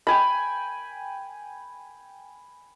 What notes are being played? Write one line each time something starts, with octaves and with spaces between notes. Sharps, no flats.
G5 G#5 B5